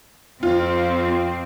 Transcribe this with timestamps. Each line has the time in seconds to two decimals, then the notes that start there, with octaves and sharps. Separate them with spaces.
0.43 F2 C4 F4